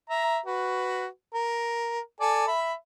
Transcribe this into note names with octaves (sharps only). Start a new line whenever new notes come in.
E5 A#5
F#4 B4
A#4
A4 D5 G#5
E5 B5